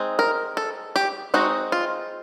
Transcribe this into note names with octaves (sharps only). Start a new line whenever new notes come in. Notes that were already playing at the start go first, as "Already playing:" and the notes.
Already playing: G#3 C4 D#4
A#4
A4
G4
G#3 C4 D#4 F#4
F4